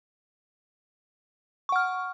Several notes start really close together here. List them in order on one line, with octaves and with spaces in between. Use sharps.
C#6 F#5 F6